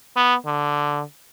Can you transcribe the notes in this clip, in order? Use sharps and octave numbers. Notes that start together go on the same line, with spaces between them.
B3
D3